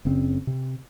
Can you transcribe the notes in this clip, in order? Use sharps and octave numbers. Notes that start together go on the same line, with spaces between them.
F#1 C#3 C4
C3